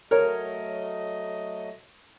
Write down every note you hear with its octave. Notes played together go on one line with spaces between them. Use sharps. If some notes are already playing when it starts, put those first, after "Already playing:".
F#3 A3 A#4 C#5 D#5